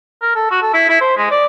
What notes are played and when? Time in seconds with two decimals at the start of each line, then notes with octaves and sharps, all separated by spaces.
0.22 A#4
0.35 A4
0.51 F#4
0.62 A4
0.74 E4
0.89 E4
1.01 C5
1.17 G#3
1.31 D5